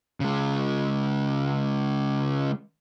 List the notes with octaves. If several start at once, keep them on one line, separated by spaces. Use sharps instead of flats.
C#3 G#3